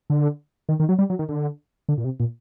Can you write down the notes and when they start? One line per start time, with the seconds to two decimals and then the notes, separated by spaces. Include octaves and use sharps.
0.10 D3
0.69 D#3
0.80 D#3
0.89 F#3
0.99 G3
1.10 F#3
1.19 D#3
1.29 D3
1.89 D3
1.98 A#2
2.04 C3
2.20 A#2